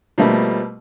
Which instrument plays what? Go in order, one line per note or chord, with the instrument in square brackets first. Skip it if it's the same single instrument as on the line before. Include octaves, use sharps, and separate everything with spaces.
[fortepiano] B2 F3 G3 A3 A#3